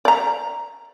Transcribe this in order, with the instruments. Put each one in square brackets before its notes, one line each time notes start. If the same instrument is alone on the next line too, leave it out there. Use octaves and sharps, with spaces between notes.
[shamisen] D5 A#5